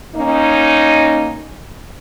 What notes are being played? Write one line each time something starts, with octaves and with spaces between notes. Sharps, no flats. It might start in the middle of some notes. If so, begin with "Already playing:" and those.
A#3 C#4 D#4